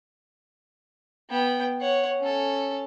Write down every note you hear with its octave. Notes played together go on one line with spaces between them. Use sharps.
B3 G5
C#5 F#5
C#4 A4